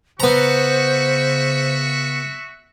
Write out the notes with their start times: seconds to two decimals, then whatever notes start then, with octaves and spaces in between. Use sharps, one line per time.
0.20 C#3 B3 F#4 C5 E5 A#5 C#6